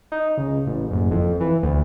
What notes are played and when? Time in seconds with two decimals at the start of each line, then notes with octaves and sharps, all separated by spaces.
0.12 D#4
0.37 C#2
0.67 A1
0.91 F#1
1.11 F2
1.40 E3
1.63 D2